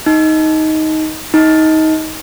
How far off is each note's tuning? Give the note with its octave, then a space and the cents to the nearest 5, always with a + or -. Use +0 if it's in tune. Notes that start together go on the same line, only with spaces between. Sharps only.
D#4 +10
D#4 +20